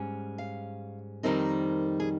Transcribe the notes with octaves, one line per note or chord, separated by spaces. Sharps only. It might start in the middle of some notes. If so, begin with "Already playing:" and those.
Already playing: G#2 G3 C#4
F5
F2 D#3 G3 C4 D#4 A#4
G#4